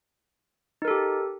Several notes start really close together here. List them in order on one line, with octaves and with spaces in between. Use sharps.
D#4 A#4 A4 G4